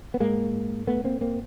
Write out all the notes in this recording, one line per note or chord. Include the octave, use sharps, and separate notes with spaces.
B3
G#2 G#3 A#3
A3 B3
A#3 C4
A#3 C4